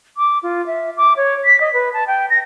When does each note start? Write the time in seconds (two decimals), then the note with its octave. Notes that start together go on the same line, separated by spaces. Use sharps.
0.17 D6
0.43 F4
0.67 E5
0.97 D6
1.17 C#5
1.45 B6
1.61 D#5
1.74 B4
1.94 A5
2.07 G5
2.30 A#6